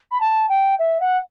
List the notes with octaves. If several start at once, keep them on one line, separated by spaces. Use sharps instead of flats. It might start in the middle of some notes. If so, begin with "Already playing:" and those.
B5
A5
G5
E5
F#5